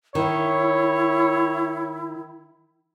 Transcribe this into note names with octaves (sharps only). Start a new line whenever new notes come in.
D#3 E4 C#5